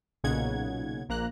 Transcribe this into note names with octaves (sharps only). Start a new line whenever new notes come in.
B1 A#2 C#3 D#4 F#5 G#6
A#1 A#3 A#5 F#6